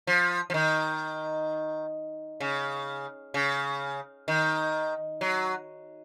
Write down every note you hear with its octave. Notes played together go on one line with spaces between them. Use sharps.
F3
F3
D#3
C#3
C#3
D#3
F#3